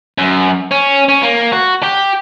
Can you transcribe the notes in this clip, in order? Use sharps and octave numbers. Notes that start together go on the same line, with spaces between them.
F#2
C#4
C#4
A#3
F#4
G4